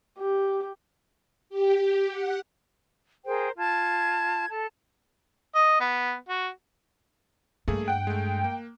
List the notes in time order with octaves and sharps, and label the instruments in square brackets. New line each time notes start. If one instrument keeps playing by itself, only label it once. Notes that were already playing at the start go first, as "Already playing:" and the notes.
[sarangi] G4
[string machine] G4
F#5
[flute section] G#4 A#4 C5 G5
F4 A5 G#6
A4 A5
[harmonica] D#5
B3
F#4
[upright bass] G2 [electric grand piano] A3 A#3 G#4
[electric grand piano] F#5 F#6 [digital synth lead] G5
[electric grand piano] G#3 A3
A#3